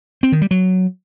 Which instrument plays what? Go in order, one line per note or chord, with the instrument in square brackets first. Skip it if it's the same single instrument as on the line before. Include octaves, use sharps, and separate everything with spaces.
[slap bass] C4
D#3
G3
F#3